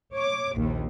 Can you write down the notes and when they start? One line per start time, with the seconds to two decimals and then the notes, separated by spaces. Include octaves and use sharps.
0.13 C#5 D6
0.54 A#1 D#2